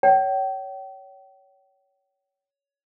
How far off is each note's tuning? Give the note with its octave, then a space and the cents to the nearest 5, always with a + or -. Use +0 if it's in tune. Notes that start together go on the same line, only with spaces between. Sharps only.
C#5 +15 G5 -40